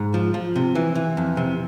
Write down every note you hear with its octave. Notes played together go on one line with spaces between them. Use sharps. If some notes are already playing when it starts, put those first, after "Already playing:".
Already playing: G#2
F3
F3
C3
E3
E3
F2
C3